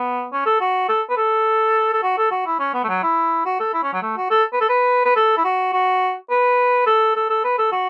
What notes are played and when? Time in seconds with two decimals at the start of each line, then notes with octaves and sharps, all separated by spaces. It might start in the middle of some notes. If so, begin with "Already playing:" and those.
Already playing: B3
0.32 C#4
0.46 A4
0.60 F#4
0.89 A4
1.09 B4
1.17 A4
1.93 A4
2.03 F#4
2.18 A4
2.31 F#4
2.46 E4
2.59 C#4
2.74 B3
2.84 A3
2.89 F#3
3.03 E4
3.45 F#4
3.60 A4
3.73 E4
3.83 C#4
3.93 F#3
4.02 A3
4.17 F#4
4.30 A4
4.52 B4
4.60 A4
4.69 B4
5.05 B4
5.16 A4
5.37 E4
5.44 F#4
5.73 F#4
6.30 B4
6.86 A4
7.16 A4
7.30 A4
7.44 B4
7.58 A4
7.72 F#4